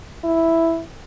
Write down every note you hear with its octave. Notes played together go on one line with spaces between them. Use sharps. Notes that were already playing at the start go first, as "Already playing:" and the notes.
E4